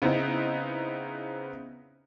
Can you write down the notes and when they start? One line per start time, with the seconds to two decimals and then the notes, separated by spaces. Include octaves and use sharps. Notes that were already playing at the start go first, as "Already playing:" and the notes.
0.02 C#3 B3 C4 D#4 E4